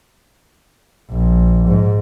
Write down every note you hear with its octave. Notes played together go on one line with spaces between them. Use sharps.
A#1
G#2